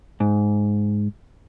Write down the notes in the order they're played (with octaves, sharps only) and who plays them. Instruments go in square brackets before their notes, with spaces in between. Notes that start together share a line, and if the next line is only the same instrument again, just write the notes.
[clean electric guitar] G#2